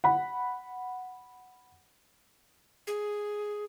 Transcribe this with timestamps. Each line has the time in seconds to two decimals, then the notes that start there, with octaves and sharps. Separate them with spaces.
0.04 F#5 B5
2.87 G#4